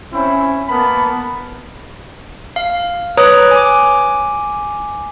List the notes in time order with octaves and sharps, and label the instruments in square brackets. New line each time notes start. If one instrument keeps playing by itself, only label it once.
[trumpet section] C4 C#4 E4
A#3 B3 A#4 A5 B5
[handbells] F5
B4 C#5 A#5 D#6 F#6
G#5 D6